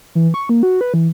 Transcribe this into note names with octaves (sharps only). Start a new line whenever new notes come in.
E3
C#6
A#3
F#4
B4
E3